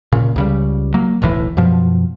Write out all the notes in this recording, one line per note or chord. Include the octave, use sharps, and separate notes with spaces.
A#2 C#3
C#2 C#3 G3
F#3 A#3
D1 B1 A2 E3
F#2 B2 F3